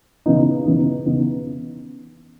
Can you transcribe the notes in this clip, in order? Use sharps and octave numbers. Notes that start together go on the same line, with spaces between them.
C#3 E3 B3 D#4
C#3 E3 B3 D#4
C#3 E3 B3 D#4